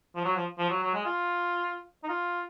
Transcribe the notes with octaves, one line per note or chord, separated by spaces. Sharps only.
F3
F#3
F3
F3
F#3
F#3
G#3
F4
D#4
F4